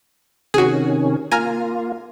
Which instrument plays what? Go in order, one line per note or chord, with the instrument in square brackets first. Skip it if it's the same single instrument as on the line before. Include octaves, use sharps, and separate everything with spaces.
[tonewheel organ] C3 D#3 C#4 [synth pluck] F#4 G#4
[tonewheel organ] A#3 F4 [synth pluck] G#5 A#5 F6